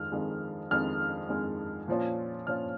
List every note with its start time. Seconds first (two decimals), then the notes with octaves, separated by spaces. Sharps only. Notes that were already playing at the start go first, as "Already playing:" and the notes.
Already playing: F2 D#3 G#3 F6
0.12 F2 D#3 G#3
0.71 F2 D#3 G#3 F6
1.29 F2 D#3 G#3
1.88 A#2 F3 C#4 F4
2.47 A#2 F3 C#4 F4 F6